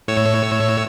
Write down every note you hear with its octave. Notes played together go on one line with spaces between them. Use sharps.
A2 C#5 E6